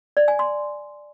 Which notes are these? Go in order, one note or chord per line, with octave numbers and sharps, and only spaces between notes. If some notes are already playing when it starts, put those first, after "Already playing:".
D5
G#5
C6